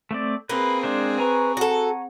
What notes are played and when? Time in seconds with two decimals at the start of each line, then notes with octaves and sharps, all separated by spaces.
0.11 A3 C4 D5
0.49 A#3 C4 G#4 B4
0.83 G#3 D4 C5
1.18 B4 G#5 A#5 C#6
1.57 F#4 A4 F#5